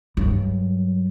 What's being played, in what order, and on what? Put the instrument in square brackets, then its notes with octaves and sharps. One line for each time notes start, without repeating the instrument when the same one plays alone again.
[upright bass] G2 F#3